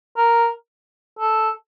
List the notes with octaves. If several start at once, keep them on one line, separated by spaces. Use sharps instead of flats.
A#4
A4